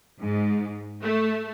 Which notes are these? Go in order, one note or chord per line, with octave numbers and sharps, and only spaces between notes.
G#2
A3